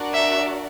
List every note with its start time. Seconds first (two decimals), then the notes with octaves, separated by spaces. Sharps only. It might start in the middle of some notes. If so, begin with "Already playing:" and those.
Already playing: D4 F#4 A#4 D5 F#5
0.13 E5